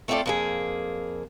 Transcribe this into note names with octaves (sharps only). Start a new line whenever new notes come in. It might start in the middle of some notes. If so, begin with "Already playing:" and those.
A3 C4 F4 G#4 A4 D5
F2 A#3 G#4